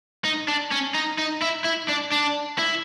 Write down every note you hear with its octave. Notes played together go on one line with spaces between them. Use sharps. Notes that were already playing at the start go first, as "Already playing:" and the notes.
D#4
D4
C#4
D#4
D#4
E4
E4
D4
D4
E4